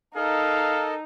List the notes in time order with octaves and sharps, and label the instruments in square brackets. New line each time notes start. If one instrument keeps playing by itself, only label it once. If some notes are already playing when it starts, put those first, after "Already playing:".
[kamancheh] D#4 [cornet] A4 [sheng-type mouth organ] A#4 D#5 [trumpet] F5